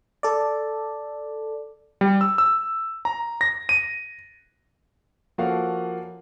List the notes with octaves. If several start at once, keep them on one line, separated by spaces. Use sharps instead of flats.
A4 D5
G3
E6
E6
A#5
A#6
D#7
F3 A#3 C#4 F#4 A4 F5